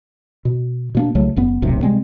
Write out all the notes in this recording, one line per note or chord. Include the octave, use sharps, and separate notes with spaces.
B2
B2 A#3 D4
C2 C#3 F#3 A3
F#1 F#2 B3
D1 B1 F#2 C3
C3 G3 G#3 C4